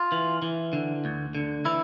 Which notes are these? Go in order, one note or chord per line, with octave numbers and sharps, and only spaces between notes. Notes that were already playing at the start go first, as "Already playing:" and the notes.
Already playing: F4
E3
E3
D3
D2
D3
E3 E4